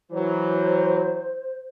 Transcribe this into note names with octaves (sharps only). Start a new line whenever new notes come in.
E3 F#3 C5